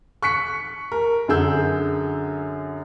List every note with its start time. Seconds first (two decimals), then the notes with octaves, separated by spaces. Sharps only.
0.22 C#6 F#6 B6 C#7
0.92 A#4
1.28 F#2 D3 G#4 E6 G6